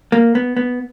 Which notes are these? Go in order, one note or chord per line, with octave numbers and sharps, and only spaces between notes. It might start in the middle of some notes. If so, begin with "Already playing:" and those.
A#3
B3
B3